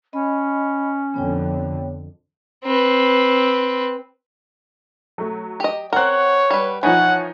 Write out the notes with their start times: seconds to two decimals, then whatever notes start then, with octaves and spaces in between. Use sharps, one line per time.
0.13 C#4 D#5 B5
1.14 F2 D3 B3 C#5 G5
2.64 C4 B4
5.18 F#3 A3
5.60 G4 D#5
5.93 C4 A#4 C#5 F#5 F#6
6.50 G3 B4
6.83 E3 F3 D#4 C#5 F#5